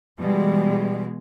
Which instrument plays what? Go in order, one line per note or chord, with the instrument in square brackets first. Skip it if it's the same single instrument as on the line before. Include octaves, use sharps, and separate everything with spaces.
[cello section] B2 E3 G#3 [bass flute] G3